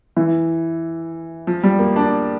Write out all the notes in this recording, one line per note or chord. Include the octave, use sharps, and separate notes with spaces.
E3
F3
G3
A#3
D4